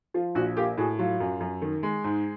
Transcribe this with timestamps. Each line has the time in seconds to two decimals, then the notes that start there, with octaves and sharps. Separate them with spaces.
0.14 F3 F4
0.35 A#1 F#4
0.57 A#3 F4 G4
0.77 A2 F#4 G#4
0.99 F#3 F4
1.20 F#2
1.40 F#2
1.62 D#3
1.83 G#3
2.04 G#2